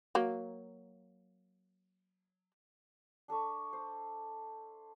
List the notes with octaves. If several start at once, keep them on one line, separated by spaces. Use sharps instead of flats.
F#3 A#3
D4 A4 E5 C#6
C5